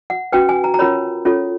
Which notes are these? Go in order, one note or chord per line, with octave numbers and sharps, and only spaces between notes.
F#5
C#4 F#4 B4 G5
G#5
A#5
A#5
C#4 F4 A#4 C#5 B5
C#4 F4 A4 C#5